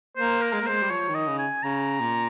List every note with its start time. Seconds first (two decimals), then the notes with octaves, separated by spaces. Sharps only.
0.17 A#3 C5
0.41 A#4
0.53 G#3
0.61 A#3
0.66 G#3 C5
0.82 G3
0.90 F3 C#5
1.08 D#3
1.15 D#5
1.27 C#3
1.39 G#5
1.63 C#3 A#5
2.00 A#2